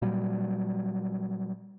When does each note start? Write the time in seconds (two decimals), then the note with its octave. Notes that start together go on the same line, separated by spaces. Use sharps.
0.02 A#2 F#3 G3